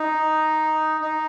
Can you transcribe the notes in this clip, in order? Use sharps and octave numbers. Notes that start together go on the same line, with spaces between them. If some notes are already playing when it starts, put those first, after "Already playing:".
Already playing: D#4
D#4